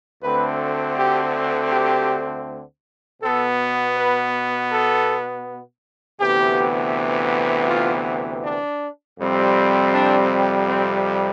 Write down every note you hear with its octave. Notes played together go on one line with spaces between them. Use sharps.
D2 D3 A3 C4 B4
G4
G4
B2 B3 A4
B4
A4
D2 C3 E3 B3 G4
F4
D4
F2 C3 G3 C4
D4
C4